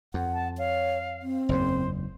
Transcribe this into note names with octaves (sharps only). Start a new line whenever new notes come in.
F2 F#5
A5
C#5 F5
C4
F#1 E2 G#2 C5